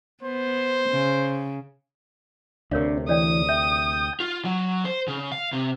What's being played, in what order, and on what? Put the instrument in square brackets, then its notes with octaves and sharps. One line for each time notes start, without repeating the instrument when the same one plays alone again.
[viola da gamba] B3 [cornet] C5
[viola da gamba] C#3
[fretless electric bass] D2 C3 [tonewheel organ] D4 [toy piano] A#4 C#5 F5
[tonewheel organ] E3 [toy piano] C#5 D5 G5 [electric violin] D#6
[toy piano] E5 [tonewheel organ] G5
[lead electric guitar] F4
F#3
C5
C#3
F5
C3